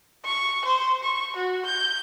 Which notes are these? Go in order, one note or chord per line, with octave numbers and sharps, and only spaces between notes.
C#6
C5
C#6
F#4
G6